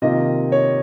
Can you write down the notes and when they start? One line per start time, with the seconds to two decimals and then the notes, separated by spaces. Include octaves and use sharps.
0.02 C3 D#3 A#3 F4 D#5
0.52 C#5